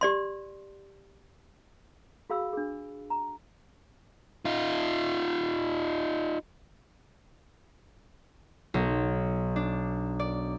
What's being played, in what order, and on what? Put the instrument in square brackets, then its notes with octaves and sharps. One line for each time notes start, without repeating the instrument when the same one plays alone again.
[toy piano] G4 D5 C6
F#4 G#4 F5 B5 E6
D4 G#4
A#5
[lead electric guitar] D#4 F4
[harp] B1
D4
D5